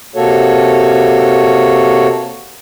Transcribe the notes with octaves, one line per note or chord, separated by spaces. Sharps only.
C3 A#3 F#4 A4 C#5